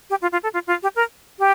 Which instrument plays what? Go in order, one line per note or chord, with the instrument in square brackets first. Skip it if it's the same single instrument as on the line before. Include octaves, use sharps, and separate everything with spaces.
[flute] G4
F4
F4
A4
F4
F4
G4
A#4
G4